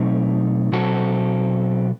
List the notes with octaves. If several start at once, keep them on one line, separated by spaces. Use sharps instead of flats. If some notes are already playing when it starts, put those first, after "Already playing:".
Already playing: B2 F#3 A3 C4 D#4
B2 F#3 C4 F#4 A4